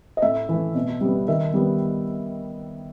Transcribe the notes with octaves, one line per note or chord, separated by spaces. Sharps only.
D#5
A2 E5
E3 A3
B2
G3 B3
D#3 E5
G3 B3